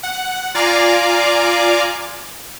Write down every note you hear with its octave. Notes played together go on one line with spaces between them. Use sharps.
F#5
F4 D5 F5 G#5 A#5 D6